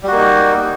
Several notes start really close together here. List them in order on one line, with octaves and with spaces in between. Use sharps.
G3 F#4 A#3 D#4